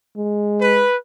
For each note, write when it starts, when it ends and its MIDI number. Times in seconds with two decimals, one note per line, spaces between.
0.17 0.86 56
0.61 0.95 71